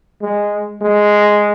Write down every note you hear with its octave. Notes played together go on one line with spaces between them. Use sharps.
G#3
G#3